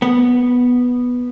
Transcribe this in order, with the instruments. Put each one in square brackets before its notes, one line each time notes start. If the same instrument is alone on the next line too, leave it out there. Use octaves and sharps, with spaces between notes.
[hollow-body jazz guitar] B3